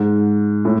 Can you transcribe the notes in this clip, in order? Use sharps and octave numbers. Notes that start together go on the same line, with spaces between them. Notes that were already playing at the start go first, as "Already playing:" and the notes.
Already playing: G#2
A2